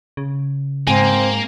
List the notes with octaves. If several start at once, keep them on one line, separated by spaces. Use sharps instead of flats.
C#3
G#2 A#3 C4 G#5